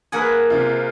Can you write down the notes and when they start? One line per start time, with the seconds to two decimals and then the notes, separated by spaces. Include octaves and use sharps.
0.12 A#3 G#4 A#4 B4 F#5 G#5
0.50 C3 F4